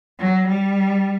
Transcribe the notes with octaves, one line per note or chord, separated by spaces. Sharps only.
F#3
G3